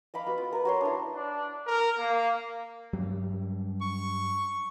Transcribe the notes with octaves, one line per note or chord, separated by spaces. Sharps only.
D#5 F5 B5 D6
B3 F#4
F4
A#4 B4
F#4 C#5 C6
D4 E4
D4
A#4
A#3
G2 F#3 G3
C#6